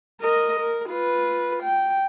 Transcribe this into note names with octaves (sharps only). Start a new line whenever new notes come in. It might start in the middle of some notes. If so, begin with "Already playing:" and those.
A#4 D#5
A#4
F4 B4
G5